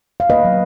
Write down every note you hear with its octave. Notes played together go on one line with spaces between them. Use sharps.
F5
A#3 B4 D#5
F#3